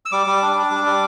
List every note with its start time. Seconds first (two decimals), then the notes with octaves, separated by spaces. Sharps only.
0.06 E6
0.12 G3 D6
0.27 G3
0.42 D4
0.56 D4
0.71 G3
0.86 G3